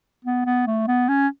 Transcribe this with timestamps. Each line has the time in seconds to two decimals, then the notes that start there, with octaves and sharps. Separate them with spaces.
0.25 B3
0.46 B3
0.67 A3
0.87 B3
1.09 C#4